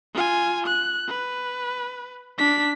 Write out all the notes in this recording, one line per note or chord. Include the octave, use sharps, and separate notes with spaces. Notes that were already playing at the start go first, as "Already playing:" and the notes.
F4 G#5
F#6
B4
D4 B6